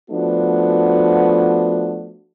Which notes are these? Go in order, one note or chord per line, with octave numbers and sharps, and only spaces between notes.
F3 A3 B3 D4 F#4